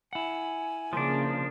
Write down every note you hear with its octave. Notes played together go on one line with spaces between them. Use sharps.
E4 F#5 G#5
C#3 F3 A#3 D4